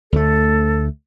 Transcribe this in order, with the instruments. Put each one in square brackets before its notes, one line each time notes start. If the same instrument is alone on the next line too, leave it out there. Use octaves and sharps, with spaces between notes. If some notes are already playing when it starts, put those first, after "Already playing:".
[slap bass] D2 A3 [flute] A4